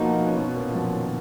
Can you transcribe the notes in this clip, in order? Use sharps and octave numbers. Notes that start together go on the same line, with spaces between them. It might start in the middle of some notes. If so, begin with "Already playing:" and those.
Already playing: B2 F3 A#3 B3 D#4 F#4
B3
C#4
B2 B3
A#2 A#3
F3
F#2 F#3
D#3